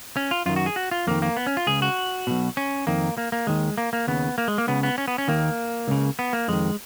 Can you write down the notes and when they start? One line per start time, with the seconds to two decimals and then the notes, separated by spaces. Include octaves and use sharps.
0.17 C#4
0.31 F4
0.46 F#2 D#3 F4
0.56 F#4
0.66 G#4
0.76 F#4
0.91 F4
1.07 F2 D#3 A#3
1.22 A#3
1.37 B3
1.47 C#4
1.57 F4
1.67 C#2 C#3 G#4
1.82 F#4
2.27 B1 B2
2.57 C#4
2.87 F2 D#3 A#3
3.18 A#3
3.32 A#3
3.47 D#2 D#3 G#3
3.78 A#3
3.93 A#3
4.07 D#2 C#3 B3
4.38 A#3
4.48 G#3
4.58 A#3
4.67 C#2 C#3 B3
4.83 B3
4.98 C#4
5.08 B3
5.18 C#4
5.28 D#2 D#3 A#3
5.88 C#2 C#3
6.19 B3
6.33 A#3
6.48 F2 D#3 G#3